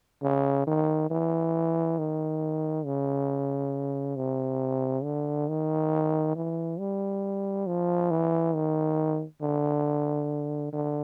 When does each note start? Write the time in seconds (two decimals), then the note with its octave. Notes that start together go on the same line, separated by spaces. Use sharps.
0.22 C#3
0.67 D#3
1.10 E3
1.98 D#3
2.85 C#3
4.16 C3
5.04 D3
5.48 D#3
6.35 E3
6.79 G3
7.67 F3
8.11 E3
8.54 D#3
9.41 D3
10.73 D3